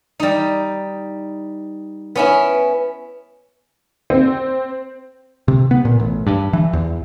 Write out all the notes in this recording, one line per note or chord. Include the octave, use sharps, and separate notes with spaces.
G3 D#4
B3 C#4 E4
C4
C3
B3
A#2
A1
G2
E3
E2